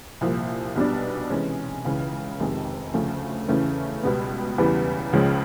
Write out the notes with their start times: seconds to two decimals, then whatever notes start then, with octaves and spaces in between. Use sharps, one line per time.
0.21 C2 A#2 F3
0.76 B1 B2 G3 B3 D4
1.30 C3 E3 G#3 C#4
1.85 C#2 C#3 E3
2.40 F1 F2 C3 D#3 G#3
2.94 D2 C#3 F3 A3
3.48 E2 C#3 E3 A3 C#4
4.03 C#2 B2 G3 B3
4.58 E2 C#3 E3 G3 B3
5.13 C#2 C#3 F3 G#3 C#4